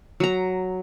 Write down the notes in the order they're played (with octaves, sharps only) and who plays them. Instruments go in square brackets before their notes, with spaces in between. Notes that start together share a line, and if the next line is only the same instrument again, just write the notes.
[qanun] F#3 A#5